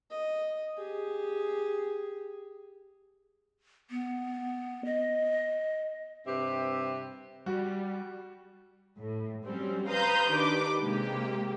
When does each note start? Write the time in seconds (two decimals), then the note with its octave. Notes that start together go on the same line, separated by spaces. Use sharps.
0.11 D#5
0.77 G4 G#4
3.90 B3
4.85 D#5
6.27 G2 C3 C4 G4 B4 E5
7.46 G3 F#4
8.98 A2
9.46 F#3 G3 C4 C#4
9.88 B4 F5 A#5 C6 D#6 G6
10.31 D#3 D4 G4 B4 D6
10.81 C3 G#3 A#3 G4